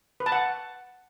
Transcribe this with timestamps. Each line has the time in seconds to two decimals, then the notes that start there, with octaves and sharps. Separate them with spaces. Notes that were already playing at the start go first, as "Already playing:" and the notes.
0.20 B4
0.26 A5
0.32 F#5